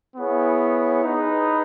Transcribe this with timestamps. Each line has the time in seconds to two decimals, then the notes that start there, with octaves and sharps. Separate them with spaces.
0.17 B3 E4 G#4 C#5
1.04 D#4 G#4 B4